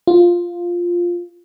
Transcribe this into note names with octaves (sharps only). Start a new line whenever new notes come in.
F4